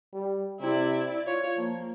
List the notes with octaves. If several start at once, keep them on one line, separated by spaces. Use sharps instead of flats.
G3
C3 E4 D5
F4 C#5
F3 A#3